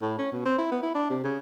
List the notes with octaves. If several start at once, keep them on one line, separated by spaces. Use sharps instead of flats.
A2
C#4
B2
C4
E4
B3
E4
D4
C3
C#3